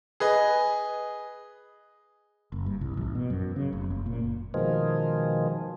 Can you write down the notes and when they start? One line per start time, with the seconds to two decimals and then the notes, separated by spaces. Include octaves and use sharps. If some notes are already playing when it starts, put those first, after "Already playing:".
0.20 G#4 B4 D#5
2.52 F#1
2.66 G2
2.81 C2
2.97 A1
3.15 B2
3.30 F#2
3.56 C#3
3.73 F1
3.90 F#1
4.06 A#2
4.24 F#1
4.54 B2 D#3 F3 G#3